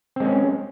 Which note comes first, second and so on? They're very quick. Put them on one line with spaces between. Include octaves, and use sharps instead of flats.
C4 G#3 C#4